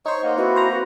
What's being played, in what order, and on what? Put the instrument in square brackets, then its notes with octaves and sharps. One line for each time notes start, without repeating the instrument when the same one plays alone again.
[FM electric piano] D#4 C5 [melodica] C#5 C#6
[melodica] A#3 [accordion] D#5 F#5
[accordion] C4 E4 B4 [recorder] F#4
[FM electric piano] C5 A#5
[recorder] F#4 [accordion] B4 F#5